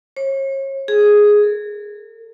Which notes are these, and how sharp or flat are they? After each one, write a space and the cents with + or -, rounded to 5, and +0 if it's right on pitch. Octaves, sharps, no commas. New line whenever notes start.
C#5 -40
G#4 +0
A#4 -40